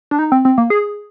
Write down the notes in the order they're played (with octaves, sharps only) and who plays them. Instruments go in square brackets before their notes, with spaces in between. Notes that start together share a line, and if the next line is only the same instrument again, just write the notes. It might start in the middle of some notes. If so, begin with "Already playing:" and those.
[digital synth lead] D4
D#4
C4
C4
A#3
G#4